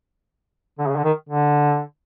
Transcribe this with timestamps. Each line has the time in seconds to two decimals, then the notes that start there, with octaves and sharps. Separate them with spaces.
0.79 D3
0.88 C#3
0.97 D3
1.04 D#3
1.29 D3